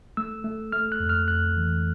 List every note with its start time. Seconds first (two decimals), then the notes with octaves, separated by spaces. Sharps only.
0.17 A3 E6
0.44 A3
0.72 A3 F6
0.92 F#6
1.00 F2
1.09 F6
1.28 F2 F#6
1.57 E3